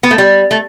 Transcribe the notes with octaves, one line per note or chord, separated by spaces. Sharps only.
B3
A3
G3
A3